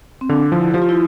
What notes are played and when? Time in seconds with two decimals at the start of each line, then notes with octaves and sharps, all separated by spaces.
0.21 C4
0.29 D3 D4
0.52 F3 E4
0.74 F3 G4
0.82 F4
0.89 E4